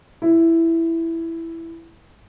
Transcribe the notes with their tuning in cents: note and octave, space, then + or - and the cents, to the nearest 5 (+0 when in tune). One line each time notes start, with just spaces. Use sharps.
E4 +5